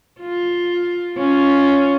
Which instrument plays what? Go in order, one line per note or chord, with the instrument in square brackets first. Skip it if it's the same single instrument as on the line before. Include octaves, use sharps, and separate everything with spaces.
[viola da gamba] F4
C#4 F4